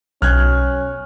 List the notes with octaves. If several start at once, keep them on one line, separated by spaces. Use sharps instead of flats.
B1 C#4 F6 F#6 G#6